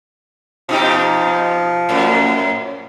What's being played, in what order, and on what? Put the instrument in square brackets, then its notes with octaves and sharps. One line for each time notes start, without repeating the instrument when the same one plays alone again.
[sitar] B2 D#4 G4 [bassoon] F3
[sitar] F#2 A2